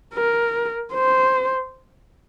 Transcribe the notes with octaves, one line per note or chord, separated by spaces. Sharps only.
A#4
C5